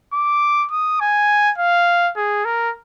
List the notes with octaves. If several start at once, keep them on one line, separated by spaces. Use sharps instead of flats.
D6
D#6
G#5
F5
G#4
A#4